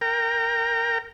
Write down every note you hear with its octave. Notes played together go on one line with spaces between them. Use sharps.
A#4 G5 A#5